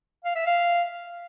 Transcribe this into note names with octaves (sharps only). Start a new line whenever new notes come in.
F5
E5
F5